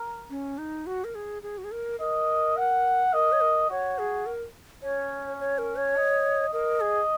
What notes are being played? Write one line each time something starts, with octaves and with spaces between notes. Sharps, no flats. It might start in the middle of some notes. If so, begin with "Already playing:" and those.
Already playing: A#4
C#4
D#4
F#4
A#4
G#4
G#4
F#4
G#4
A#4
A#4 D#5
F#5
A#4 D#5
C#5
A#4
F#4 C#5
G#4
A#4
C#4 C#5
C#5
A#4
C#5
D#5
A#4 D#5
G#4